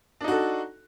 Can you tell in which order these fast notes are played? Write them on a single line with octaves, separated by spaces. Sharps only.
D4 D#4 F#4 A4